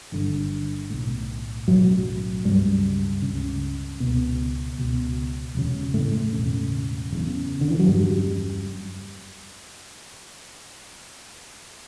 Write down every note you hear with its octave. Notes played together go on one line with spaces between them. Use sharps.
G1 G2 D3
B1 A2
B1 F#2 A2 F#3
C#2 G2 C#3 G3
C#3
C#2
C#2 B2
C#2 B2
E1 D2 C#3
A2 A3
E1 D2 C#3
F#1 E2 C#3
D3
E3
F#3
F#1 E2 G2 C#3 G3